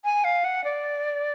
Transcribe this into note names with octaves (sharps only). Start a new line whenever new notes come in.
G#5
F5
F#5
D5